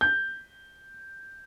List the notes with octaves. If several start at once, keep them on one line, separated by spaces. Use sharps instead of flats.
G6